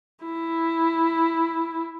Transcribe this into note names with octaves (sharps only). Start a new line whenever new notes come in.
E4